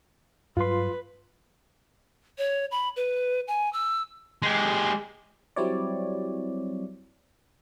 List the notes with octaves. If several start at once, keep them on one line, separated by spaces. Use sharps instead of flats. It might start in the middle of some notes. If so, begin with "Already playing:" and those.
G2 F#3 F4 B4 C6
C#5
B5
B4
G#5
E6
G#3 G4
F#3 G3 C4 E4 C#5 D5